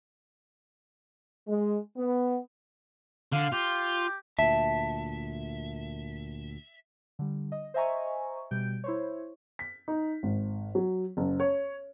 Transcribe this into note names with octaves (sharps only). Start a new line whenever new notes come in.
G#3
B3
D3 F5
F4 G4
D2 A#2 E5 A5
D3 G3
D#5
C5 D#5 E5 G#5 A#5 C#6
B2 G3 G6 D7
E4 C5 C#5
B6
D#4
G#1
F#3
F#1
C#5